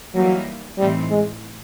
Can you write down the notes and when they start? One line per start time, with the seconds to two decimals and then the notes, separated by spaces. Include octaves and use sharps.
0.14 E3 F#3 G3 A#3 D#4
0.78 A2 E3 G3 A3 C4 D#4
1.10 G#3